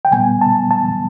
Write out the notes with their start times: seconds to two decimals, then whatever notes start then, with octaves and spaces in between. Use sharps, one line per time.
0.05 G5
0.12 A#2 G3 B3 G#5
0.41 A5
0.71 A5